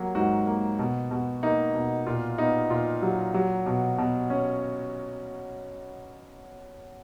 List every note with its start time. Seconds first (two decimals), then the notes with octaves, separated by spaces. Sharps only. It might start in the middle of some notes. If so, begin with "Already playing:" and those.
Already playing: F#3 A#3
0.15 G#2 F#4
0.47 A#3
0.79 B2
1.11 B2
1.43 A#3 D#4
1.75 B2
2.07 A#2 F4
2.38 B3 D#4
2.70 A#2 F4
3.02 F#3
3.34 F#3
3.66 B2
3.98 B2
4.30 C#4